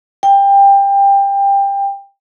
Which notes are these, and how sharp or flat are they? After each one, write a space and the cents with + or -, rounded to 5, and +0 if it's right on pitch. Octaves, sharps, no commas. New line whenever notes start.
G5 +20